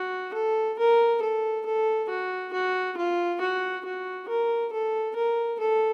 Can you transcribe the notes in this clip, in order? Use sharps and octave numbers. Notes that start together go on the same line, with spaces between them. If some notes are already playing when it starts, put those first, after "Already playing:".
Already playing: F#4
A4
A#4
A4
A4
F#4
F#4
F4
F#4
F#4
A#4
A4
A#4
A4